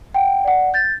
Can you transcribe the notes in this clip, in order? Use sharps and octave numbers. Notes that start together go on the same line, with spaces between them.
F#5 G5
D5 F#5
G6 A6